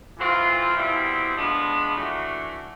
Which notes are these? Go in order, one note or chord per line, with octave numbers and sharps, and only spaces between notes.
E3 A3 C4 F4
B2 G3 C4 E4
F3 G#3 B3 D4 F4
E3 A3 D4 F#4